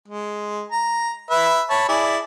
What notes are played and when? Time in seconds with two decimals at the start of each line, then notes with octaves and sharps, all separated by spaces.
0.08 G#3
0.72 A#5
1.31 B4 E5
1.70 C#5 A5 B5
1.89 E4 G#4 D5